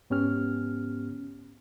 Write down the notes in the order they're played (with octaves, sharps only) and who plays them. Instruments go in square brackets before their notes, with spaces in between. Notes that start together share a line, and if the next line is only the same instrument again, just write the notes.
[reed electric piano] G#2 B3 C#4 G4 F6